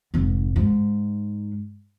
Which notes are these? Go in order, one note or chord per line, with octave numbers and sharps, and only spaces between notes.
F1 G#2
G#2